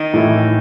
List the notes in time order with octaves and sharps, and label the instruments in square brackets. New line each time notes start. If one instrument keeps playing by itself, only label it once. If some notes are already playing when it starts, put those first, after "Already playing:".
Already playing: [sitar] D#3 D#4
[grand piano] A2 E3 A3 E4